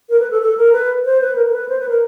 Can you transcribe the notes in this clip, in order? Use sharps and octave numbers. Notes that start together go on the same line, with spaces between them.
A#4
B4
A4
A4
A#4
B4
C5
B4
A#4
A#4
B4
C5
B4
A#4